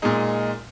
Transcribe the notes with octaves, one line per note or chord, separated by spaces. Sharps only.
A#2 G#3 D#4